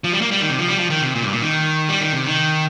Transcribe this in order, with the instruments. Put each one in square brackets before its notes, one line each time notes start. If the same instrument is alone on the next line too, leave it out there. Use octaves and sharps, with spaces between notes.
[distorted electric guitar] F3
G3
A#3
G3
D#3
C3
F3
G3
F3
D#3
C3
A#2
G2
A#2
D#3
G3
D#3
C3
D#3